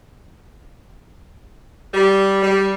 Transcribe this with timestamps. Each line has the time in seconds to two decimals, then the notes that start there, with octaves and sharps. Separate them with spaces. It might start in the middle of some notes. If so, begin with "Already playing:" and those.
1.94 G3
2.42 G3